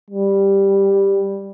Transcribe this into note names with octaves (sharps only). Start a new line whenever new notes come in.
G3